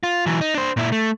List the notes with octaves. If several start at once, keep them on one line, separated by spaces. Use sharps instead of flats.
F4
E3 F#3
D#4
D4 C5
A#2 E4
A3